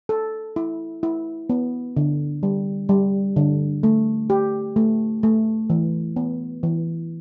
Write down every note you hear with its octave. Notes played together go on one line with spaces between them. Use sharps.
A4
E4
E4
B3
D3
G3
G3
D3
A3
G4
A3
A3
E3
B3
E3